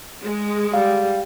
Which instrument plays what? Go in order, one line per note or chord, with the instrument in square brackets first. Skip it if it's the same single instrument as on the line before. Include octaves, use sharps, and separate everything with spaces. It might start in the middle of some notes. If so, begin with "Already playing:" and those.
[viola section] G#3
[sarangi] G3 [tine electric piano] F5